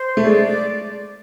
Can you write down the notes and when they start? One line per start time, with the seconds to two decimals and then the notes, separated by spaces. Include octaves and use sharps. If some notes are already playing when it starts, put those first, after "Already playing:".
Already playing: C5
0.17 A3
0.25 G#3 D5